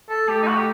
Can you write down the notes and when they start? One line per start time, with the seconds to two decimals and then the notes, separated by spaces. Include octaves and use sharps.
0.09 A4
0.28 A3 G4
0.42 D#4
0.47 F#4
0.56 G4